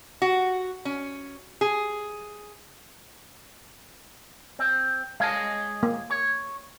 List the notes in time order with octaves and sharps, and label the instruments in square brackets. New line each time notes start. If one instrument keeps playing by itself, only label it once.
[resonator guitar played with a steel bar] F#4
C#4
G#4
[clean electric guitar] C4
[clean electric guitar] G#3 C#5 D#5 [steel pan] F5 A5
[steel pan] A#3
[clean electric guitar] C#5